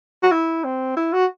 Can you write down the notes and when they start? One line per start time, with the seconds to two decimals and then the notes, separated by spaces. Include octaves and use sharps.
0.23 F#4
0.32 E4
0.64 C4
0.97 E4
1.13 F#4